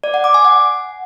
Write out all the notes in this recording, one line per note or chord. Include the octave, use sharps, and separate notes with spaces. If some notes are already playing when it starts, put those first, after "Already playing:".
D5
F#5
D6
G#5
F#5